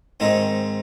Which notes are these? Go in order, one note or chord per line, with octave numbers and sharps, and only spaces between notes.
G#2 D#3 G#3 C4 D#4